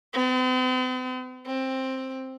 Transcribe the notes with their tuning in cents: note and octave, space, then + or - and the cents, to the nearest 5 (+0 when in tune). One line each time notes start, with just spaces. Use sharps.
C4 -45
C4 +10